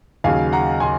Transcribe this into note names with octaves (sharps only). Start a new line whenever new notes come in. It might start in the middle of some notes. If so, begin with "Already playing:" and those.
D#2 C#3 F#3 F5 G#5
F#5 A#5
C#3 G#5 C6